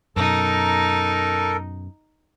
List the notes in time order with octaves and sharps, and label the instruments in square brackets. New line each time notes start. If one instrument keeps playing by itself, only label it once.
[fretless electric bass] F#2 B2 [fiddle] D#4 [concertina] A4 A#4